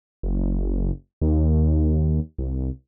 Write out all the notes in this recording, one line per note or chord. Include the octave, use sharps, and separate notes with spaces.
F#1
D#2
C2